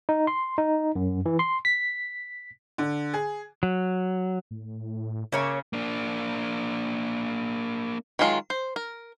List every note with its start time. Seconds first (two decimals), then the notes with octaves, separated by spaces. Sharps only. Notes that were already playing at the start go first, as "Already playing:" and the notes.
0.09 D#4
0.27 C6
0.58 D#4
0.95 F#2
1.26 E3
1.39 C6
1.65 B6
2.78 D3
3.14 G#4
3.63 F#3
4.51 A2
5.32 C#3 A#3 C#5 E5
5.73 A#3 D4
8.19 D#3 F#3 G#3 F4
8.50 C5
8.76 A#4